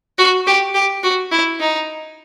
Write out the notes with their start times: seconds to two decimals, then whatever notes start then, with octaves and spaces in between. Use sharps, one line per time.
0.18 F#4
0.47 G4
0.74 G4
1.03 F#4
1.32 E4
1.60 D#4